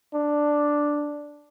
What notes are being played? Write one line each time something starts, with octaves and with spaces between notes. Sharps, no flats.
D4